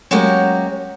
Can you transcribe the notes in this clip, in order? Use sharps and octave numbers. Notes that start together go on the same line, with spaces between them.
F#3 G#3 A#3 C#4 F#4 G4